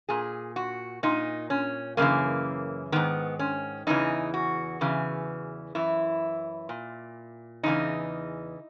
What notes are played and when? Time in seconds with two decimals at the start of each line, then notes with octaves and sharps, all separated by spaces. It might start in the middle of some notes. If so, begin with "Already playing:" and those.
0.09 A#2 G#4
0.56 F#4
1.03 A#2 D#4
1.50 C#4
1.97 F#2 C#3 E3 A#3
2.92 G#2 D#3 B3
3.39 C#4
3.87 E2 C#3 E3 D#4
4.34 F#4
4.81 E2 C#3 E3
5.75 F#2 E3 E4
6.69 A#2
7.63 E2 C#3 E3 D#4